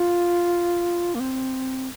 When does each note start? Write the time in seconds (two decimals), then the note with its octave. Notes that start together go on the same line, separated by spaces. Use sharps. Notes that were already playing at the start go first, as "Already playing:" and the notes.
Already playing: F4
1.15 A#3
1.20 C4